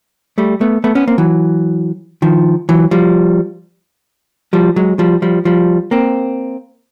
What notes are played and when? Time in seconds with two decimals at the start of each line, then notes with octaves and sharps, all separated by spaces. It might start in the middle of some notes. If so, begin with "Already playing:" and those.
0.38 G3 A3
0.61 A3 B3
0.84 A3 B3
0.95 B3 C#4
1.08 A#3 C4
1.18 E3 F#3
2.22 D#3 F3
2.69 E3 F#3
2.91 F3 G3
4.53 F3 G3
4.76 F#3 G#3
4.99 F3 G3
5.22 F3 G3
5.45 F3 G3
5.91 A#3 C4